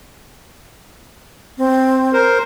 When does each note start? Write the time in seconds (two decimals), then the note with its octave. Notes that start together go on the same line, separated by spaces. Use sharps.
1.58 C4
2.13 A#4 C5